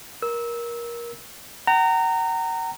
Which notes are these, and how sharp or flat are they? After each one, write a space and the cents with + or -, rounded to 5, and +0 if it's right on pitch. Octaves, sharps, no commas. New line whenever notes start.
A#4 +20 E6 -20
F#5 +45 A#5 -20